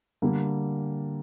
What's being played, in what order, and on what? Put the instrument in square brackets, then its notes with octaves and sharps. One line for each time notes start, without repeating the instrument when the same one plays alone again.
[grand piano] D3 G3 A#3